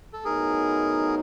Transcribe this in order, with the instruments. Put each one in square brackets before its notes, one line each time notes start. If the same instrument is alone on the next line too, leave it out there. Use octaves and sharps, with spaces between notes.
[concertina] A4
[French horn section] A2 F#3 B3 D#4 [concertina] G#4 A#4